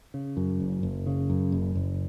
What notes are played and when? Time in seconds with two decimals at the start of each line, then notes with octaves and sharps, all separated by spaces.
0.14 C#3
0.37 F#2
0.60 F#1
0.83 F#1
1.07 C#3
1.30 F#2
1.52 F#1
1.75 F#1